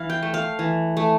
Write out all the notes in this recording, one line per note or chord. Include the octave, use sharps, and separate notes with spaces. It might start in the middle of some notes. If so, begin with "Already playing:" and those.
Already playing: E3 F5
G5
A3
F5
E3
A3